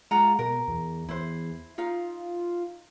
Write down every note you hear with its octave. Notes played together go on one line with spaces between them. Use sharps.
G#3 F4 F#5 A#5
B2 A#4
E2
E2 E4 C5
D#4 F4 F5